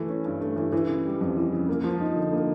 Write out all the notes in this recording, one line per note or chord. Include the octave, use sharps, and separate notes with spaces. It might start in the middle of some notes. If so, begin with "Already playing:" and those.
Already playing: E3 A3
C#4
G2
A3
E3
E3
C#3
G3
F2
E3
C#3
A#3
F3
D#4
D3
A#3